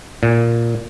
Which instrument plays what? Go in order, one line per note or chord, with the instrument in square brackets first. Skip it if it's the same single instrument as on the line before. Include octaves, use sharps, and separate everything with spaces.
[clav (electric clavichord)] A#2